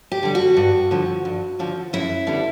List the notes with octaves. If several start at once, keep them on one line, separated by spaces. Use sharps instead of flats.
G4
D3 G3
F#4
G2
D3 F3
G2
D3 F3
F#2 E4
D3 G3 B3